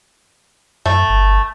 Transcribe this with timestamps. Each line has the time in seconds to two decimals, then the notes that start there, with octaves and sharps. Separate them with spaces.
0.86 F#2 A3
1.09 G1